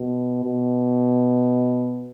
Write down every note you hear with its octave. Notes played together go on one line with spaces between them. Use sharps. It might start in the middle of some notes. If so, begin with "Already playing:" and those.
Already playing: B2
B2